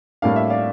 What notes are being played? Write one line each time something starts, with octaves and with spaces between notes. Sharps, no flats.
A2 G3 A#3 D4 F5
E5
D5 F5